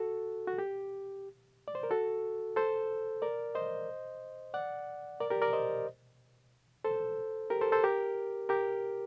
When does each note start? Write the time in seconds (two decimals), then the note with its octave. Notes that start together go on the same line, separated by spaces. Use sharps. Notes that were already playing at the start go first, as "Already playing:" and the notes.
Already playing: F#4 A4
0.47 F#4
0.58 G4
1.68 D5
1.75 C5
1.83 A#4
1.91 F#4 A4
2.56 A4 C5
3.22 A#4 D5
3.55 C5 D#5
4.54 D5 F#5
5.20 A#4 D5
5.31 G4 A#4
5.42 A#4 D5
5.53 C5 D#5
6.85 A4 C5
7.50 G4 A#4
7.61 A4 C5
7.72 A4 C5
7.83 G4 A#4
8.49 G4 A#4